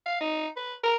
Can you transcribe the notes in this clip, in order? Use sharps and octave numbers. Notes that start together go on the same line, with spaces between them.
F5
D#4
B4
A#4